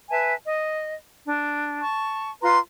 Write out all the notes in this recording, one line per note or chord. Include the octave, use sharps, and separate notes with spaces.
B4 E5 G#5 A5
D#5
D4
A5 C#6
F4 B4 A#5 C6